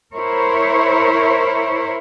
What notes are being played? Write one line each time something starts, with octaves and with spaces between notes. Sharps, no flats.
E4 A#4 C5 C#5